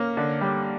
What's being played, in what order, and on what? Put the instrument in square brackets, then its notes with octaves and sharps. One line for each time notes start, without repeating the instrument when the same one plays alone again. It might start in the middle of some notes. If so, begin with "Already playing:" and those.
Already playing: [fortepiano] A#3 [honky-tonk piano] C#4
[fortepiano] D3
G3